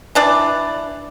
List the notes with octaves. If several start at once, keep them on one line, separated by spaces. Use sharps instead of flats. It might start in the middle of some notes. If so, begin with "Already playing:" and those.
E3 D4 D5